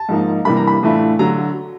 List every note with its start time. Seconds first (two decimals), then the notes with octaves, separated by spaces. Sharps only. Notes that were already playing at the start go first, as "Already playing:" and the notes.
Already playing: A5
0.09 G#2 F3 A#3 D#4
0.45 C3 E3 G3 A#3 D4 B5
0.57 A#5
0.67 B5
0.82 A2 E3 A3 D4 F4
1.19 D3 F#3 A#5